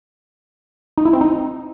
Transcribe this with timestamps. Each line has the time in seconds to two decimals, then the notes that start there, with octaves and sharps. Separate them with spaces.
0.98 D#4
1.05 E4
1.13 C4
1.21 D#4